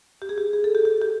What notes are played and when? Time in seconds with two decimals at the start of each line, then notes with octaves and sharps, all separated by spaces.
0.22 G4
0.29 G#4
0.38 G4
0.53 G#4
0.64 A4
0.75 G4
0.85 G4
1.01 G4